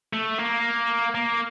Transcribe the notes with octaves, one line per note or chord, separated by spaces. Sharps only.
A3
A#3
A#3